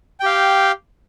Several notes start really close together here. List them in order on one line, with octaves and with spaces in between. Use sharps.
G5 G4 F5